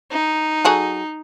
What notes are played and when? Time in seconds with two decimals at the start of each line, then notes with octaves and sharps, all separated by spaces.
0.11 D#4
0.65 F#3 G#4 A4